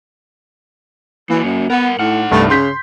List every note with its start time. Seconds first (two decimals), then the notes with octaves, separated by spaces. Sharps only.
1.30 E3 A#3 F#4
1.44 F#2
1.70 B3 A#4 F#5
1.99 A2 D#4 F#5 F6
2.31 C2 G2 A3
2.50 C#3 C6 G6 B6